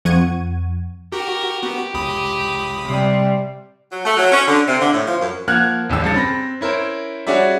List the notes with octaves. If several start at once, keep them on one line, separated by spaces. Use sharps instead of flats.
F2 F3 F#5 C#6 G#6 D#7
F#4 G4 A#4
B3 F#4 G4
C#2 B5 D#6
C3 G3
F#3
A3
F#3
C#4
D3
C3
D3
A2
F3
F#2
F3 A#3 F#5 F6 F#6 G#6
E1 A1 D#2 E6
D#1 G2 C#3 A6
C4 B5 A#6
C#4 E4 A#4 C5
G3 C#4 F#4 G#4 D5 E5